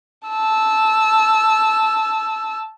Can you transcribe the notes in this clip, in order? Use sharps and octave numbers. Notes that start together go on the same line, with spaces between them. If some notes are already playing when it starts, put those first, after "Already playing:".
A5 E6